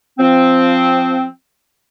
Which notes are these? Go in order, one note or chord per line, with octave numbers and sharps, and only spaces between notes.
F3 C4